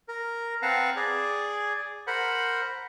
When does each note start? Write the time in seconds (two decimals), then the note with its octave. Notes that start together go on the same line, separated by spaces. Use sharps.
0.08 A#4
0.62 C4 B4 F5 F#5 A5 A#5
0.96 G#4 D5
2.07 A#4 C5 F#5 B5